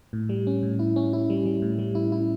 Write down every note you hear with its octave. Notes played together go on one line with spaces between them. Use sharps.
A2
G3
C#4
A2
E4
C#4
E4
G3
G3
A2
G3
E4
E4